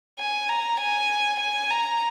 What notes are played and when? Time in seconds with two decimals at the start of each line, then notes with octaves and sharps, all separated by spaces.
0.19 G#5
0.49 A#5
0.80 G#5
1.40 G#5
1.70 A#5